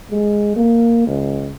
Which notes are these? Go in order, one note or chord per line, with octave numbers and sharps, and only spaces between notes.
G#3
A#3
C#2